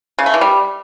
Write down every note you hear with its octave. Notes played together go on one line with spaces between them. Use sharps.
C#3
A3
E3
G3